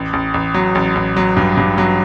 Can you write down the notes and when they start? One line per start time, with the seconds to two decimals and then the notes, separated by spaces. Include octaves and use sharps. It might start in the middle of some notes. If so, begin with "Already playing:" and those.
Already playing: A1
0.13 A1
0.34 A1
0.54 F#3
0.75 A1
0.95 A1
1.17 F#3
1.37 G2
1.57 G2
1.78 F#3